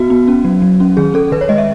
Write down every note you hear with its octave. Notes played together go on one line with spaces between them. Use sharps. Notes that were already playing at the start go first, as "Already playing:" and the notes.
Already playing: B3 F#4
B3
C#4
F#3
F#3
C#4
D#3 G#4
C#4 A4
D#3 B4
C#5
G#3 D#5
E5